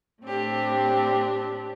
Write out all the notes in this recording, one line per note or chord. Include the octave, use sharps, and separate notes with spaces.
A2 A3 C4 D4 G4